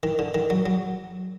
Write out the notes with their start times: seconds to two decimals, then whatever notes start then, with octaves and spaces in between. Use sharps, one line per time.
0.03 D#3
0.19 D3
0.34 D#3
0.50 F#3
0.66 F#3